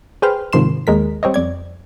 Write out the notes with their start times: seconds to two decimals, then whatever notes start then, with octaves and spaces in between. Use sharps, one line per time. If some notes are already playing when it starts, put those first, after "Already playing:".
0.22 G#4 B4 C5 G5 F6
0.53 G#2 C3 D#3 F3 C6 E7
0.87 D#2 G#3 A#4 B6
1.23 G3 C4 C#5 D#5
1.34 F2 D5 G#6